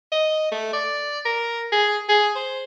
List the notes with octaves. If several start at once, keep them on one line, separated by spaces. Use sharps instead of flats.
D#5
A3
D5
A#4
G#4
G#4
C5